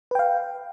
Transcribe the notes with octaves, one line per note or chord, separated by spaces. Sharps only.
B4 F5 G5